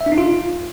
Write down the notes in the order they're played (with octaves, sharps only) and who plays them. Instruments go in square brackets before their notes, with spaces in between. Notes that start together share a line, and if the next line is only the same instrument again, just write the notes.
[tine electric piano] E5
D4
D#4
F4